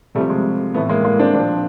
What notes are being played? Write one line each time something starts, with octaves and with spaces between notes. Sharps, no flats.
C3 F3 G3 A3
G#3
A2 E3 A3 B3
G#3 A#3
G#3 A#3
C4 D4
A#2 F3 C4 D4